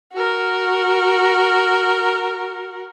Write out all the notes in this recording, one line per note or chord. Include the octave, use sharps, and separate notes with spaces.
F#4 A#4